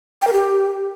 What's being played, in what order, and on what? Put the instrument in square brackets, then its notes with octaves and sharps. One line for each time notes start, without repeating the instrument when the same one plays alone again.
[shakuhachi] G5
A#4
G4